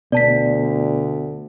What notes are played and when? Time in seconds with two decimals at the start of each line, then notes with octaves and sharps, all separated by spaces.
0.12 D2 B2 B3 D5 A5 B6